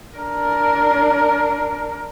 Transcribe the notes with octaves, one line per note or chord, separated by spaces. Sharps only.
D4 A#4